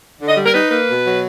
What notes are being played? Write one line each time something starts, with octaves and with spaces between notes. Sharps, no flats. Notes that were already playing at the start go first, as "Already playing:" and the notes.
D3
D#5
G3
A#4
D#4 B4
A#3 B4
B2
F#3